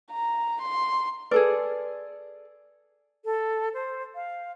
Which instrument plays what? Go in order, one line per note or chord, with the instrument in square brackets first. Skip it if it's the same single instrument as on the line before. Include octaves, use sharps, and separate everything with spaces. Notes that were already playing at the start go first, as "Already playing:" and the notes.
[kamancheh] A#5
C6
[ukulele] G#4 A4 D5 [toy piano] B4
[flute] A4
C5
F5